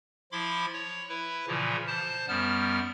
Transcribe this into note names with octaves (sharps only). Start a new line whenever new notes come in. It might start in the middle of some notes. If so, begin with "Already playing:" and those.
F3 E4 B5 C6 D6
C#5
E4 B4
A#2 C#3 E3 F3
C5 A5
F#2 G3 B3 F6